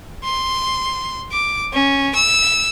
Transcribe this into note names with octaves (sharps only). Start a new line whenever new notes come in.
C6
D6
C#4
E6